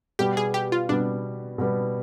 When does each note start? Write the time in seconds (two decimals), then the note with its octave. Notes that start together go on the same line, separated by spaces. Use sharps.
0.19 B2 G3 B3 G4
0.37 G#4
0.54 G4
0.72 F4
0.89 B2 G3 B3 D4
1.58 B2 G3 B3